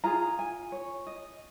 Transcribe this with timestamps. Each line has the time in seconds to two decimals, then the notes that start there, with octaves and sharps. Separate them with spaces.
0.04 F4 G#4 A#5
0.39 G#5
0.72 C#5
1.07 D#5